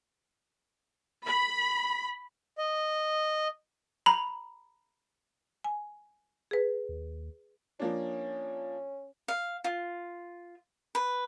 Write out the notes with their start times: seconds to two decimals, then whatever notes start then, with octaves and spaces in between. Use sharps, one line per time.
1.28 B5
2.58 D#5
4.06 A#5 B5
5.64 G#5
6.51 G#4 B4
6.89 D#2
7.79 F3 A#3 C#4 D4
9.28 F5
9.64 F4
10.95 B4